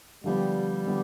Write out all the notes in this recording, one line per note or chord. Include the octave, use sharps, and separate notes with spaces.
D3 F3 G3 B3
D3 F3 B3